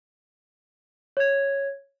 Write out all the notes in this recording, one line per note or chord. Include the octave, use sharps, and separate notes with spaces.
C#5 G#6